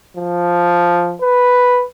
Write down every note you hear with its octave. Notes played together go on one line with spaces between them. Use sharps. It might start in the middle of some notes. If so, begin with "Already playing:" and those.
F3
B4